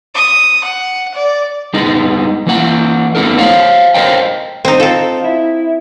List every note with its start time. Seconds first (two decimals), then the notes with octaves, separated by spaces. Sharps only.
0.14 D#6
0.64 F#5
1.14 D5
1.74 G3 G#3 B3 D#4
2.47 E3 A#3 F#5
3.15 A3 B3 D#4 A4 A#4
3.37 C5 C#5 F5
3.94 A#4 C5 C#5 D#5 F5 G5
4.65 C4 D#4
4.80 C4 F4 A4
5.24 E4